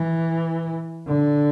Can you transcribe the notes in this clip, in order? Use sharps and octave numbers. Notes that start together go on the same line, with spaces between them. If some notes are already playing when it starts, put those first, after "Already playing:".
Already playing: E3
D3